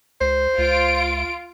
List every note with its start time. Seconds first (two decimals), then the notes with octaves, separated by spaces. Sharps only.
0.21 C#2 C5
0.58 C#2 F4 D7